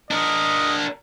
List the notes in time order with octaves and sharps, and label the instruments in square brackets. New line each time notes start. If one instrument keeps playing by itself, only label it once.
[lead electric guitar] D4 A#4 [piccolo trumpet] D#5